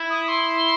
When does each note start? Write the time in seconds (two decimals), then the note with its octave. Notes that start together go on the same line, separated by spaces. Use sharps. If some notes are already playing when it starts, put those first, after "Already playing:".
Already playing: E4
0.10 D#6
0.28 C6